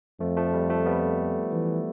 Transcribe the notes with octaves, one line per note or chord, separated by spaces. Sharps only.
F2 F3 A3
F3 A3
G3
F3 A3
G3 B3
E3